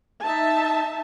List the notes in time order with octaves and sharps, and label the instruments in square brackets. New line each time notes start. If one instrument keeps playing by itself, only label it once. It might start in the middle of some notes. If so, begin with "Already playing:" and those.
[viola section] D#4 E5 A5